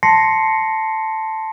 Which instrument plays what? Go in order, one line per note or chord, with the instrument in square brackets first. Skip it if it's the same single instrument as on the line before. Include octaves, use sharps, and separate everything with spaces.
[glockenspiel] A5 C6 A#6 C7 C#7